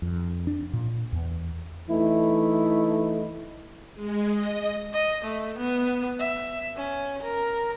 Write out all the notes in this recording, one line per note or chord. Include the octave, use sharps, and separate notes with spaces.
F2
D4
A#2
E2
E3 A3 D#4 E4
G#3
D#5
D#5
A3
B3
E5
C#4
A#4